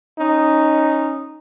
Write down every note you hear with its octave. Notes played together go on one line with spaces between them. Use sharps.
C#4 D#4